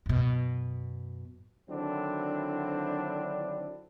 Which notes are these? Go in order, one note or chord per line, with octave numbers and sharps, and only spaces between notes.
F#2 B2
D3 D#3 F#3 C4 D4 E4